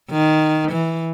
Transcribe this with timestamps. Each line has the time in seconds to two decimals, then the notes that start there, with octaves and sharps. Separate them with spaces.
0.10 D#3
0.72 E3